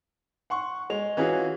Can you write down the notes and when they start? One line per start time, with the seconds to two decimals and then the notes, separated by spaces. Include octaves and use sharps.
0.50 F#5 C6 C#6
0.90 G#3 F7
1.17 E3 C#4 F4 F#4 G#4